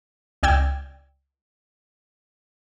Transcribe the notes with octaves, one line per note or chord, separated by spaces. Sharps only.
C#2 D5 G5 E6 G#6